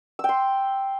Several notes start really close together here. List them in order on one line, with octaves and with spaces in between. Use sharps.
E6 G5 C6